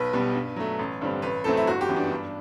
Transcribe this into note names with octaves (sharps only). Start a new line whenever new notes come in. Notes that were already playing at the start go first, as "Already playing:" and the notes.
Already playing: B1 B4
B2 G3 B3
G2
F#3 A3
A1
G2 D3 G3 C4
A1 B4
A2 F#3 A3 C4 A4
E4
G1 F#4
G4
F#2 E3 B3
D4
G2